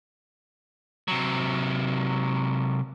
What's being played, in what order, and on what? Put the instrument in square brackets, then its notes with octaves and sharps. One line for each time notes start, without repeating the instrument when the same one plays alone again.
[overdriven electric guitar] C3 F#3